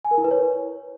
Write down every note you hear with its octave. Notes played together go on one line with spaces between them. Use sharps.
G#5
A#4
E4
B4
C#5